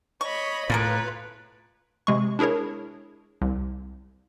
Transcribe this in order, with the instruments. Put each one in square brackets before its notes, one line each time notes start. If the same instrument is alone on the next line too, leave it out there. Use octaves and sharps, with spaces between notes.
[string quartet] C#5 D#5 B5 [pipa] C#6
[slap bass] A2 [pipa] A#3 G#4 A#4 [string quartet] F4 B4
[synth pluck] C3 G#3 C#6
D4 E4 G#4 A#4 C#5
C2